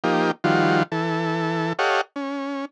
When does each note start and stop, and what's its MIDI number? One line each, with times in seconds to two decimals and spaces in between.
0.04 0.31 53
0.04 0.31 58
0.04 0.31 63
0.04 0.31 67
0.44 0.83 51
0.44 0.83 53
0.44 0.83 55
0.44 0.83 65
0.44 0.83 66
0.92 1.73 52
0.92 1.73 69
1.79 2.01 67
1.79 2.01 69
1.79 2.01 73
1.79 2.01 75
1.79 2.01 77
1.79 2.01 78
2.16 2.65 61